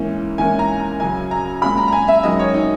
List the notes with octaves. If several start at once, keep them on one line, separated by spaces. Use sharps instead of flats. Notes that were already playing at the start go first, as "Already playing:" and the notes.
Already playing: G#2 E3 A#3 C#4
G#2 E3 A#3 C#4 G#5
A#5
A#5
F#2 C#3 F#3 G#5
A#5
A#2 G#3 C#4 B5
A#5
A#5
G#5
E5
F#2 D#3 G#3 C#4 D#5
C#5
D#4